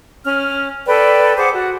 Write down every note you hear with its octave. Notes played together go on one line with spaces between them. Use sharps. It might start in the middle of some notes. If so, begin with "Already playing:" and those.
C#4 F6
A4 B4 D5 G5
G#4 C5 F#5 D6
F#4